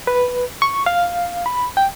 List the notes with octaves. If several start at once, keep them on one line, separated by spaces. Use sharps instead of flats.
B4
C#6
F5
B5
G5